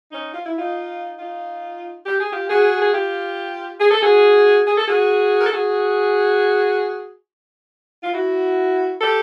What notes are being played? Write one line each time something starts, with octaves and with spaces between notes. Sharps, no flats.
C#4 D#4
F4
E4
D#4 F4
D#4 F4
G4
G#4
F4 G4
F#4 G#4
G#4
F4 G4
G#4
A4
F#4 G#4
G#4
A4
F#4 G#4
A#4
A4
F#4 G#4
F4
E4 F#4
G4 A4